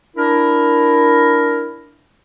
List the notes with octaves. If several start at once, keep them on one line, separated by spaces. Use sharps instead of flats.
D4 E4 A#4